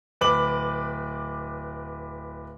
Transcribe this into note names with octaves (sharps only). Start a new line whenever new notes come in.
D1 B4 D6 F#7